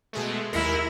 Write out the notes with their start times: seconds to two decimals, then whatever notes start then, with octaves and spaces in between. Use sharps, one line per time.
0.13 B2 G#3 A3
0.53 D#2 G#3 E4 A#4